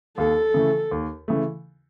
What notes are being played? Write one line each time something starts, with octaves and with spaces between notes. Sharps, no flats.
D#2 A4
C#3 E3 A3
D#2
C#3 E3 A3